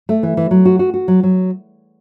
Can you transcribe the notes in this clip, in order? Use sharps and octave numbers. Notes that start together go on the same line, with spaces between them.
A3
E3
E3
F#3
F#4
F#4
F#4
F#3
F#3